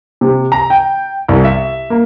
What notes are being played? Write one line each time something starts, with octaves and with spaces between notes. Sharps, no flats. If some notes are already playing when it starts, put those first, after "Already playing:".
C3
A#5
G5
C2
E5
A#3